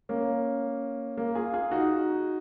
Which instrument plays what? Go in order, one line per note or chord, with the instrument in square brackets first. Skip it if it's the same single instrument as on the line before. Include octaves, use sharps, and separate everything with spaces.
[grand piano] A#3 C#4
A#3
F4 G#4
F4 G#4
D#4 F#4